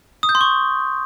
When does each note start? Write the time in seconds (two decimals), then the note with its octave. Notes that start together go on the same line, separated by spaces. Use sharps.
0.23 D#6
0.29 G6
0.35 C6
0.41 C#6